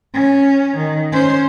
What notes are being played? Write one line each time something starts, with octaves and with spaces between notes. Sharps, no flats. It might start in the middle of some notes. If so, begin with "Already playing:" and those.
C#4
D#3
C#4 C5